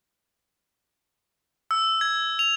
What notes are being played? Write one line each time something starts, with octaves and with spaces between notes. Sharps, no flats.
E6
G#6
F7